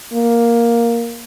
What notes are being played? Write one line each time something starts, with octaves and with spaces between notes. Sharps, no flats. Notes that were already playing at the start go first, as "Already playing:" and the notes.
A#3